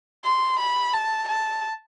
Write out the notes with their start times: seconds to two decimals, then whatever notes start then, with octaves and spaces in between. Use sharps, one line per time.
0.24 C6
0.59 B5
0.94 A5
1.29 A5